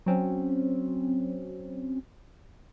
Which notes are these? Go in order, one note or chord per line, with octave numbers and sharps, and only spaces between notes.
F#3 C4 C#4